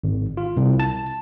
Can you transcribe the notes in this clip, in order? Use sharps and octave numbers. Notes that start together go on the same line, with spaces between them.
G#1
F4
C2
A5